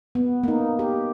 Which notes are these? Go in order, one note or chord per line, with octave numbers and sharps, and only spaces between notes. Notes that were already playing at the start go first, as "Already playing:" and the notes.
B3
A#3 D#4
G4